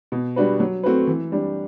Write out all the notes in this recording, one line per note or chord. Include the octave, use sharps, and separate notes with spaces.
B2
G3 D4 F#4 B4
F#3
A3 C4 F#4 B4
E3
G3 D4